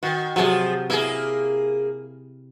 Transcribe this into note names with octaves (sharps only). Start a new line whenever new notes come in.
D#3 F#4
C3 F3 F#3 G#4
A#3 E4 G#4